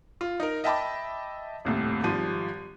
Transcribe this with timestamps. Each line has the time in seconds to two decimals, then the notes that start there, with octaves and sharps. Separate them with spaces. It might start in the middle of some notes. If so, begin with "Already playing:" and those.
0.21 F4
0.40 D#4 A#4
0.64 D#5 E5 G5 A5 B5 D6
1.65 D#1 C2 A2
2.04 G#1 F3 G3 D#7